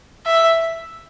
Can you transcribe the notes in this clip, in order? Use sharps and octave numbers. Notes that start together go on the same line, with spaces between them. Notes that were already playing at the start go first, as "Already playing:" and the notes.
E5